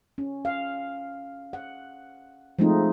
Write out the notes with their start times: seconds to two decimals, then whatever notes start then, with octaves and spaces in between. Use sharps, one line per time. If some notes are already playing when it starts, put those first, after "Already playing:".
0.18 C#4
0.45 F5
1.53 F#5
2.59 F3 G#3 A3 C4 D#4 F4